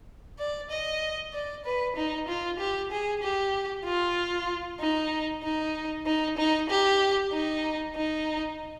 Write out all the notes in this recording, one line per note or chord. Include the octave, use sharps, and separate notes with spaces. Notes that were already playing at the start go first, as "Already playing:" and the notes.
D5
D#5
D5
B4
D#4
F4
G4
G#4
G4
F4
D#4
D#4
D#4
D#4
G4
D#4
D#4